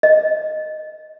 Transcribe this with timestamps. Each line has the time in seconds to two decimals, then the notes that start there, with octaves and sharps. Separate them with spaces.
0.03 D#5